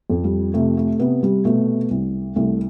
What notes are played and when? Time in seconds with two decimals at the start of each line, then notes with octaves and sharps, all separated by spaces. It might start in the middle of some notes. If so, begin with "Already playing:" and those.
0.10 F2
0.24 G3
0.54 C3 A3
0.77 A3
0.99 C3 B3
1.23 G3
1.45 B2 A3
1.91 C2
2.36 C2 A3